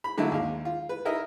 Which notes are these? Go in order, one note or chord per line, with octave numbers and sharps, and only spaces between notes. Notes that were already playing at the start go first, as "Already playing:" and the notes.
B5
D3 F#3 A#3 D#4 E4
D#2 G#3 F5
F4
B4
D#4 E4 A#4 D#5 E5